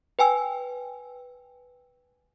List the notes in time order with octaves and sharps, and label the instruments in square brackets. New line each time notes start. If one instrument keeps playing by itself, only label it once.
[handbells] B4 G5 G#5 E6